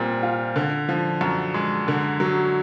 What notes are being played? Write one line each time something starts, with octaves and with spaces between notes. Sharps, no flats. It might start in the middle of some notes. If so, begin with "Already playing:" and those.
Already playing: A#2 G3 C4
F4
D3
F3
F#2
G#3
D3
F#3